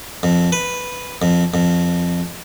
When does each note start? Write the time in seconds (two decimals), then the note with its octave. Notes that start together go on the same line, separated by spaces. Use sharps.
0.23 F2
0.52 B4
1.22 F2
1.54 F2